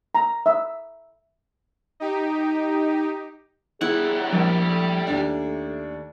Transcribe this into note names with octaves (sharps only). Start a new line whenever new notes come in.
A#5
E5
D#4 G4
G3 E4 G#4 F#5
A#1 A#3
A3
D#2 D4